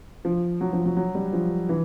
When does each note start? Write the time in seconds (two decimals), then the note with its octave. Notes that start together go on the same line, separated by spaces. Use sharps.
0.25 F3
0.61 F#3
0.73 F3
0.85 F#3
0.96 F#3
1.15 G3
1.33 F3
1.69 E3